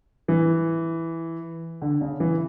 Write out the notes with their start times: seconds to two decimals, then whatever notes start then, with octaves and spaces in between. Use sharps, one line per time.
0.28 E3
1.82 D3
2.01 C#3
2.20 E3